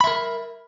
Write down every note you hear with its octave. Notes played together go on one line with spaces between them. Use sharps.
A#4 E5 B5